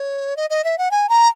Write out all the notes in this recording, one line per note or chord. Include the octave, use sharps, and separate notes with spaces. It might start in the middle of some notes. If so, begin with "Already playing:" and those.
Already playing: C#5
D#5
D#5
E5
F#5
G#5
A#5